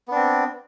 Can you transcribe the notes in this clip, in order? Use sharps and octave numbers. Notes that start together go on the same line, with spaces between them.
B3 C4 D4